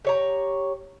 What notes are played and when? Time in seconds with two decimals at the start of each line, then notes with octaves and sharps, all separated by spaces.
0.05 G4 C#5 A#5